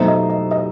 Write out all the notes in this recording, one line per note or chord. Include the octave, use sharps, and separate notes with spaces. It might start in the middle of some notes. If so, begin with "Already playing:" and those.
Already playing: B2 F#3 A3 D#4 C5 E5
D#5
D#5
D#5